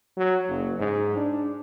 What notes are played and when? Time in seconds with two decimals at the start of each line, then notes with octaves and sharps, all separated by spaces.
0.17 F#3
0.47 F#1
0.79 G#2
1.16 D4